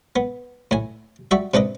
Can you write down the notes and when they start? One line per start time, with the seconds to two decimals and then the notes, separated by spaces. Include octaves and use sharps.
0.16 B3
0.71 A2 G#5
1.31 G3 F#4 E5
1.54 C3 D4 B4 D#5